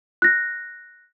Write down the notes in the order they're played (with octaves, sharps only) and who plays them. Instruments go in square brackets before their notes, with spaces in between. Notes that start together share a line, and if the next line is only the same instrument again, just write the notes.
[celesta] F#6 A#6